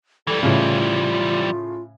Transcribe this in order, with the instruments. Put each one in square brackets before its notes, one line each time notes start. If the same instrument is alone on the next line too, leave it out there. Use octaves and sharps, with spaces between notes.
[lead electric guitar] E3 G3 [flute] A4
[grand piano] A2 C#3 [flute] F4